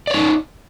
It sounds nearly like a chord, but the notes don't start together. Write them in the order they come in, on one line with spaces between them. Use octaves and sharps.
D5 C#5 D#4